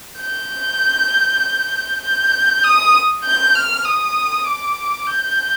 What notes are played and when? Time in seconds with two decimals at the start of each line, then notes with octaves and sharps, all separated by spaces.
0.20 G6
2.03 G6
2.63 D#6
3.24 G6
3.55 F6
3.85 D#6
4.46 D6
5.07 G6